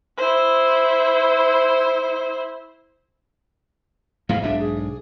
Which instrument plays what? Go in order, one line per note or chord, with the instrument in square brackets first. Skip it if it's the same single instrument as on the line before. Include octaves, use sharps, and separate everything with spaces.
[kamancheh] E4 C5
[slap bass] G#2 B2 E3 [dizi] F5
[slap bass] B1 G#2 D4 [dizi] E5
[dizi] G#4